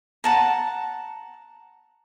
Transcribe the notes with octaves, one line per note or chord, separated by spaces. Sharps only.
F#5 A5 A#5